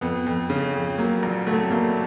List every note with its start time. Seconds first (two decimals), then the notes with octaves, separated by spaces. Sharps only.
0.01 F2 B3
0.26 F2
0.50 C#3
0.75 F2
0.98 F#3 A#3
1.23 A#1
1.46 F#3 A3
1.70 A3 A#3